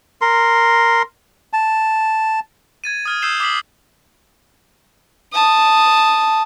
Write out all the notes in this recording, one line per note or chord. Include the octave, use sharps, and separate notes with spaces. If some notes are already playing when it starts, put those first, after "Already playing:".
A#4 C6
A5
G#6 A6 D#7
D#6 F6 G#6
D#6 E6 G6 C7 E7 G7
D6 D#6 B6 C7 F#7
A5 D#6